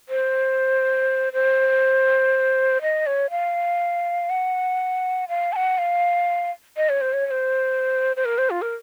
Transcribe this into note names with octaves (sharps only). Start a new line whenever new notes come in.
C5
C5
D#5
C#5
F5
F#5
F5
A5
F#5
F5
D#5
C#5
C5
C#5
C#5
C5
C5
A#4
C5
F4
A#4